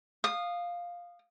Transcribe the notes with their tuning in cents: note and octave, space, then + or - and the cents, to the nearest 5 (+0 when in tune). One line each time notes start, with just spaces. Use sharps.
F5 +5 D#6 -20